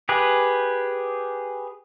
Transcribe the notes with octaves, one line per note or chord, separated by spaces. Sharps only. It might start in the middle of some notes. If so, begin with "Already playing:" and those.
G4 G#4 B4